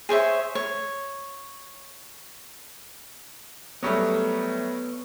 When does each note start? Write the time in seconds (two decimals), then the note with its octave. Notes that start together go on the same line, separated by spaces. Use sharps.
0.09 G#4 C5 C#5 E5
0.55 C#5
3.83 F#3 G3 A3 B3 C#5